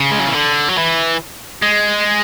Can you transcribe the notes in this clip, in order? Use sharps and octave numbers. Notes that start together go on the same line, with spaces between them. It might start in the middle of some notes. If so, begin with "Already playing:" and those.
Already playing: C#3
G#3
F#3
E3
D3
F#3
E3
G#3